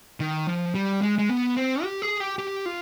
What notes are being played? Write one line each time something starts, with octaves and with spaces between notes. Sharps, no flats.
D#3
F3
G3
G#3
G#3
B3
C4
G4
G#4
G4
G4
F4